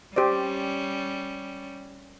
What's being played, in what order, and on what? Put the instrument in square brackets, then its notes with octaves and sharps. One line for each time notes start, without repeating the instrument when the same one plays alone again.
[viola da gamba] G3 C#4 [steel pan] G4 C5 D5